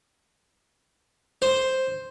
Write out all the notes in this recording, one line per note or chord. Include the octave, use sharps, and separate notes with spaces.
C5